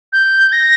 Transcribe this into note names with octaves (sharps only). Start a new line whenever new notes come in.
G6
A#6